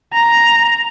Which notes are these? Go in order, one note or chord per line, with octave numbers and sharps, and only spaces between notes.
A#5